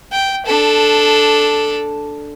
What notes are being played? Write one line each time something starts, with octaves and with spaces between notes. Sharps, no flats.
G5
D4 A4